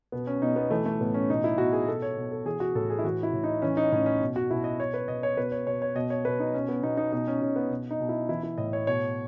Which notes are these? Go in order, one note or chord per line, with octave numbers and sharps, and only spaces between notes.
B2 B3
C#4
B2 D#4
B3
E3 A3
A3
A2 B3
C#4
B2 D#4
E4
B2 F#4
G#4
B2 A4
C#5
B2
A4
E3 G#4
F#4
A2 A4
G#4
E4
E3 F#4
E4
A2
D#4
E3 C#4
D#4
A2 C#4
C#4
B2
F#4
B2 E4
D#5
B2 C#5
B4
B2 D#5
C#5
B2 B4
C#5
B2 C#5
C#5
B2 D#5
C#5
B2 B4
D#4
B2 C#4
B3
B2 D#4
D#4
B2 D#4
C#4
B2 C#4
B3
B2
D#4
B2
E4
E3 E4
E4
A2 D#5
C#5
B2 C#5